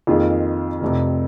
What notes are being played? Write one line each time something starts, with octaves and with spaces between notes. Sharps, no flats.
F2 D#3 A#3 F4 G#4
F1 F2 C3